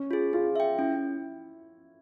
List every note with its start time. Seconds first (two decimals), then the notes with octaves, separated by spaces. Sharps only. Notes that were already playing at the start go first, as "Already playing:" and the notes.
Already playing: C#4
0.11 F4 G#4
0.33 F4 G#4
0.56 E5 G5
0.79 C#4 E4